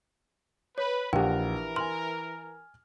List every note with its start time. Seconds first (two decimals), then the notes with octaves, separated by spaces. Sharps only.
0.78 B4 C#5
1.13 A#1 E3 G4 A#4 F#5 G5
1.76 G#5 C6 F6